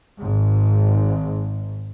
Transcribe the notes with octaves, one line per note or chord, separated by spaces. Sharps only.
G#1 G#2